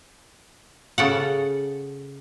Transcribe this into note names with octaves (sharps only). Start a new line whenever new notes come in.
C#3 A4 F#5